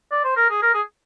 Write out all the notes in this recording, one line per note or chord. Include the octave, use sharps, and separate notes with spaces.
D5
C5
A#4
G#4
A#4
G#4